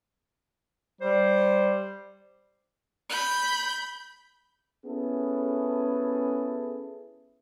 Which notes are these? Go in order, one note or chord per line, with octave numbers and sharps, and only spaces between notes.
G3 C5
B5 G6
B3 C#4 E4 G#4 A4